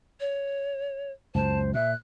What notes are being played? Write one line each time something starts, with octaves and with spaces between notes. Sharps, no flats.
C#5
C#2 F#2 C5 A5
A#2 E5 F#6